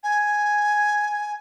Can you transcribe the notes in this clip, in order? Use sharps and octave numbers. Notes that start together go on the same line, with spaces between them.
G#5